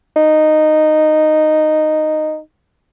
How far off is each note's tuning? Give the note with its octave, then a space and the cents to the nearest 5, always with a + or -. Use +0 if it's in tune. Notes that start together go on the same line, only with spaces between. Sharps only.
D#4 -10